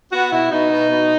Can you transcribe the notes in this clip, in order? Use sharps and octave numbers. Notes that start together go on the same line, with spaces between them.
B3 F#4
B2 E4
B2 D#4
B2
B2